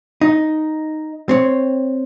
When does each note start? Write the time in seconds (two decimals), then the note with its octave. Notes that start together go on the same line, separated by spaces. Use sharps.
0.21 D#4
1.29 C4 C#5